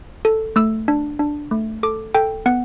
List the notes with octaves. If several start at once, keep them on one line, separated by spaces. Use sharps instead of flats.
A4
A3 E6
D4
D4
A3
A4 D6
A4 G5
B3 F#5